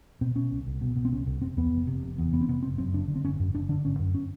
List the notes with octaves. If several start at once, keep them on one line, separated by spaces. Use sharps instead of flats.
B2 C4
B2 C#4
C2
C2
B2
B2
C4
C2 C#4
C2
F1 C4
E2 B3
F1
C3
F1
E2
F1 B3
C4
C3 B3
F#1 C4
F#2 C4
F#1 D4
D3
C4
F#1 C#4
F#2
F#1 D4
D3 D4
G#1 C#4
F#2
C#4